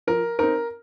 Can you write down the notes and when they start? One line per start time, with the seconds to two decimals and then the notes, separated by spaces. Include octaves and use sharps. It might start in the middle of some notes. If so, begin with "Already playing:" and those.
0.07 F3 A#4
0.39 C4 D#4 A#4